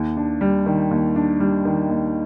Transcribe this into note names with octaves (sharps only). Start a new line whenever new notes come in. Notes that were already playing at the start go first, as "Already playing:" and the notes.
Already playing: D#2
D4
G3
D#3
D#2
D4
G3
D#3
D#2